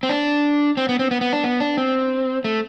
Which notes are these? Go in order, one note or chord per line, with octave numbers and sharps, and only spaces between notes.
C4
D4
C4
B3
C4
B3
B3
D4
B3
D4
C4
A3